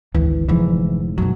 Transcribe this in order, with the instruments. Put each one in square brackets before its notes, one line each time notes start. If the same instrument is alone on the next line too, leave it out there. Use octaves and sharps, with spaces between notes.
[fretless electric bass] G#1 E3 [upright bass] D2
[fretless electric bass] F1 G#2 [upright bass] D3 F3 [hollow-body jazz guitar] E3
[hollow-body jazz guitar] B1 F#3 [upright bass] F#2 D3